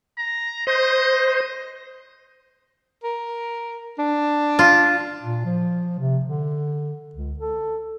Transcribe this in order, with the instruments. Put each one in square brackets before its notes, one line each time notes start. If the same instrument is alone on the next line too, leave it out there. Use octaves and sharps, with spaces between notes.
[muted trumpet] A#5
[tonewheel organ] C5 [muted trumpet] D#5
[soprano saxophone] A#4
D4
[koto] F4
[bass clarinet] A#2
F3
C3
D3
C#2
A4